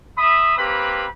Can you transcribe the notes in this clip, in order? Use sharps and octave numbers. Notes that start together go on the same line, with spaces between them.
E5 B5 D#6
A#3 C4 G4 B4 B5